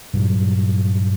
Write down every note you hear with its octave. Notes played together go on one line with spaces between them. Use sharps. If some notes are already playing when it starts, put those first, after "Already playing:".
G2 A#2 F#3